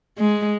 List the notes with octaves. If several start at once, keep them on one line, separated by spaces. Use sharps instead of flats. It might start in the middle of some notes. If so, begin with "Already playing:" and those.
G#3